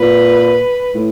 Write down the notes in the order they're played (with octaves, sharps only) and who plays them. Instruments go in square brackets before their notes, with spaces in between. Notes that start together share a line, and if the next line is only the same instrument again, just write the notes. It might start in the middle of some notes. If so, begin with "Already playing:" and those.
Already playing: [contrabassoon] A#2 [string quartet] B4
[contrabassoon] A2